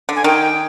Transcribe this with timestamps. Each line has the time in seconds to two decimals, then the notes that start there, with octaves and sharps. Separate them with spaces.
0.09 D3
0.16 G#5
0.24 D#3 G5